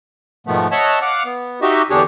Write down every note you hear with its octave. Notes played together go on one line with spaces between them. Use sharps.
G#2 B2 D#3 F3 A3 B3
C#5 D#5 E5 F#5 A5
F5 F#5 D6 F6
B3
D#4 F#4 G4 D#5 E5
E2 D3 D4 G4 G#4 C#5